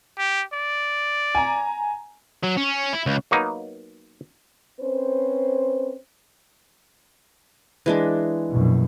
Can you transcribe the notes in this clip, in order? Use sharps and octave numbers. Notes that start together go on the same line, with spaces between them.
G4
D5
G#5 A#5
F#3
C#4
E4
C#2
F#3 A#3 B3 D#4
C4 C#4 B4 C5
E3 G#3 D4
A#1 F#2 B2